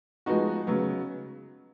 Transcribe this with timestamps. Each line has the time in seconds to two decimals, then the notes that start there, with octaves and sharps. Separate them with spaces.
0.26 F3 G#3 B3 D#4 F#4
0.67 C#3 F#3 B3